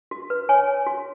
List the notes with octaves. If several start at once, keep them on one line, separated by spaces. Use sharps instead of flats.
F#4
B4
C#5 G#5
C#5
F#4